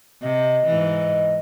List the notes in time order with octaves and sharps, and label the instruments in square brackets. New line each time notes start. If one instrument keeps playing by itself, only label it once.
[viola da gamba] C3 [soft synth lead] D#5
[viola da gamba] G#2 E3